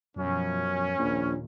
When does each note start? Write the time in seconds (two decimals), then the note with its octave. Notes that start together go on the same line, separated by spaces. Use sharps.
0.16 F#2 B2 F3 C#4
0.98 A#1 D#2 A#2